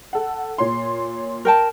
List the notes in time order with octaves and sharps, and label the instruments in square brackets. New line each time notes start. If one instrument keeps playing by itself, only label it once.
[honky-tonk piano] A4 F#5
A#2 C#5 C6
[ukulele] A#4 G5 A5